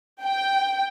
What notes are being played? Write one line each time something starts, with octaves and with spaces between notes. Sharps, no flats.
G5